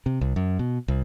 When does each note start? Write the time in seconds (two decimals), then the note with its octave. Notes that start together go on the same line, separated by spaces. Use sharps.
0.06 C3
0.21 C2
0.36 F#2
0.59 B2
0.88 C2